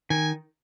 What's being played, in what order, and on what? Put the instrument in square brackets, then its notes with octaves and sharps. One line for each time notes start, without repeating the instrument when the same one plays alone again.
[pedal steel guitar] D#3 [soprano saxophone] G#5